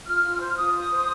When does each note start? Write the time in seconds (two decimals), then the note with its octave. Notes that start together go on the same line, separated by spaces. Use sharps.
0.05 F4 F6
0.22 F4
0.39 C5
0.47 F6
0.57 F4 D#6
0.74 C5
0.91 C5